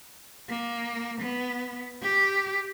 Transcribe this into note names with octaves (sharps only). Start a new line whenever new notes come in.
A#3
B3
G4